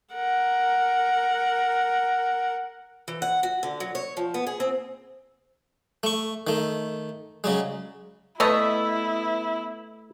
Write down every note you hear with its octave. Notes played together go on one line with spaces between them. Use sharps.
A#4 F#5
E3
F#5
F#4
D3
F#3
C#5
F3
B3
G#4
C4
A3 C#6
D#3 A3
C#3 F#3 G#3
A3 B3 E4 B4 C#5 D#5 E5